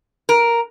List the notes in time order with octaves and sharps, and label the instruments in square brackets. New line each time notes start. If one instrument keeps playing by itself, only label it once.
[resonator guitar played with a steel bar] A#4